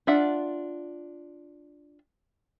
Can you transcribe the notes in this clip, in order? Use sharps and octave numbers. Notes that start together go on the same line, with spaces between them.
D4 F4 E5 F#5